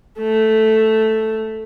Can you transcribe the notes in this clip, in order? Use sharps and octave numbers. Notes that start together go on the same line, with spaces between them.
A3